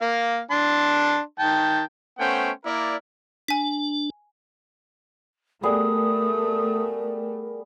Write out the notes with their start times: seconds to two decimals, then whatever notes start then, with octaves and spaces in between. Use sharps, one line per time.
0.02 A#3 F5
0.51 D4 A5 C6
1.39 D#3 G5 A5
2.18 A3 B3 C#4 C5 F#5 G5
2.65 A#3 E4 A#4 D5
3.48 D4 G#5 B6
5.63 G3 A3 B3 G#4 A#4 D#6